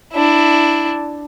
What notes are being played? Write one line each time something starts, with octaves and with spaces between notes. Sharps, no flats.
D4 E4